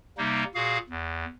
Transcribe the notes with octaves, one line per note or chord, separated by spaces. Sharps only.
C3 G3 A#3 D#4
A#2 F#4 G#4 F5
E2